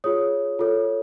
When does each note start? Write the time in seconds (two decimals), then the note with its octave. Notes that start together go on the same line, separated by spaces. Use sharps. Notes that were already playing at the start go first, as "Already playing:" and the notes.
0.04 F4 G#4 C#5 D#6
0.59 F4 A4 C#5